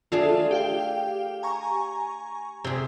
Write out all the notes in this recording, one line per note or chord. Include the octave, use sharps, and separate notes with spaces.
A3 D4 F4 G#4 A4
G4 F5 G5
G#5 A#5 C#6
C3 G#4